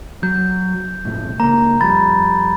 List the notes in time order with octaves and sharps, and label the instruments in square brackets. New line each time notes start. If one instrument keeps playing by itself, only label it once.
[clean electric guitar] F#3 [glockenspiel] G6
[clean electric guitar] B1 F2 A2
[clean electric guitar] C#2 A#3 [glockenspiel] A#5
[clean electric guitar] F2 G3 [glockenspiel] B5 A6